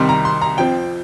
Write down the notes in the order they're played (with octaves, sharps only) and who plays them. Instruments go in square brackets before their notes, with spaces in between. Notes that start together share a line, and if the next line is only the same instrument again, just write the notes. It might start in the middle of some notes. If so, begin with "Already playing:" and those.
Already playing: [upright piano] C2 C3 D#3 G3 C6
A#5
C6
A#5
F2 F3 C4 G5